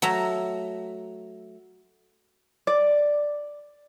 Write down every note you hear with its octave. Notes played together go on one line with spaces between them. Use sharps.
F#3 A3 E5 A#5
D5